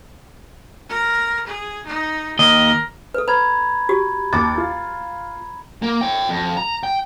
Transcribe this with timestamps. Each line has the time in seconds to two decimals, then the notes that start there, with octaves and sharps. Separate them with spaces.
0.90 A#4
1.48 G#4
1.87 D#4
2.39 D#2 A#4 D#5
3.14 A4 B4
3.28 B4 A#5 B5 G#6
3.89 F#4 G4
4.33 D#2 D6 A6
4.58 F4
5.82 A#3
6.01 C#5 G5
6.29 F2
6.57 A#5
6.83 G5